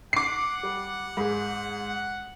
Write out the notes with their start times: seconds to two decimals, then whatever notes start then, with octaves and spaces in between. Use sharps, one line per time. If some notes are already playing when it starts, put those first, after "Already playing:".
0.13 F#5 D6 C7
0.63 G3
1.17 G#2 G#4